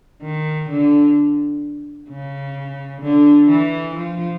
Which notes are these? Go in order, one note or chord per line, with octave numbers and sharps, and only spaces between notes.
D#3
D3
C#3
D3
E3
F3